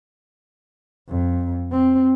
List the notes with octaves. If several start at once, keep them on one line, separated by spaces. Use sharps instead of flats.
F2
C4